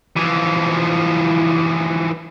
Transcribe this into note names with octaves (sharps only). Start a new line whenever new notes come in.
E3 F3